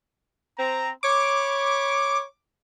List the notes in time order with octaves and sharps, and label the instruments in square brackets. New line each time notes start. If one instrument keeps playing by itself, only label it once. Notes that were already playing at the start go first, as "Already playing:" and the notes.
[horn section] C4 A#5
[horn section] C#5 B5 [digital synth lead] D6